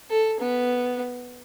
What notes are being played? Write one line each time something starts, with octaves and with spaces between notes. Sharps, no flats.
A4
B3